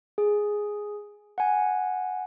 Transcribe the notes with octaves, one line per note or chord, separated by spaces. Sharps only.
G#4
F#5 G#5